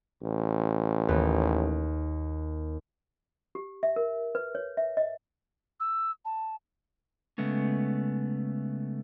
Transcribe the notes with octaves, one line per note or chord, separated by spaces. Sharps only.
A1
D#2 B4
G4
E5
A#4
B4
C#5
E5
D#5
E6
A5
C#3 G#3 A3 B3 C#4